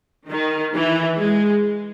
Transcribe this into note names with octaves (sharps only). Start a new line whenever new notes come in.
D#3
E3
G#3